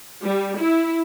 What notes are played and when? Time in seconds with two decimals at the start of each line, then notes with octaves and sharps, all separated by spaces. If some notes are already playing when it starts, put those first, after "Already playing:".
0.23 G3
0.58 E4